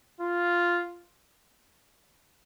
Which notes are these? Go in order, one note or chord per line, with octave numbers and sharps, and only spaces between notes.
F4